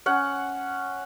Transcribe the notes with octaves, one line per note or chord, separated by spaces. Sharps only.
C#4 F#5